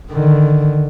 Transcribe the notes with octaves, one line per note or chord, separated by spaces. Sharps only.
D3 D#3